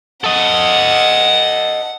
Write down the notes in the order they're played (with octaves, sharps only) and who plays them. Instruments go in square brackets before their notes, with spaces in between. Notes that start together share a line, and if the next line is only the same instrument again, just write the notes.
[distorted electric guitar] A4 D#5 [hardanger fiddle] F#5